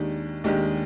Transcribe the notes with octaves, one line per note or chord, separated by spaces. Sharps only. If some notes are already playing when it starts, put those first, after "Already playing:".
Already playing: D#2 D#3 G#3 D4 G4
D#2 D#3 G#3 D4 G4